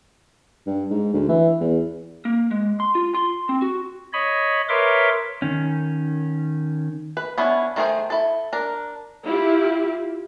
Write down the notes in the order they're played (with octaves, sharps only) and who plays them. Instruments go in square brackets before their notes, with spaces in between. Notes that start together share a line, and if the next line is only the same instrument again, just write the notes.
[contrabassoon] G2
G#2
D2
E3
E2
[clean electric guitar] A#3
G#3
C6
F4
C6
C4
F#4
[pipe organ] C#5 D#5 B5
A#4 B4 C#5 E5 C6 D6
[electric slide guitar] D#3 C#4
[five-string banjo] B4
B3 C#4 D4 E4
D#3 A3 F4 G#4 C5
E4 A4
D4 A#4
[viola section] E4 F4 G4